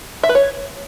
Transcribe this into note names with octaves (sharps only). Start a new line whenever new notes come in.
E5
B4
C#5